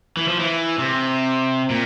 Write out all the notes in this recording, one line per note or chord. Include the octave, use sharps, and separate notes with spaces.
E3
F3
E3
C3
A#2